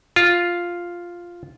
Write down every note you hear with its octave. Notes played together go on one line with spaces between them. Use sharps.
F4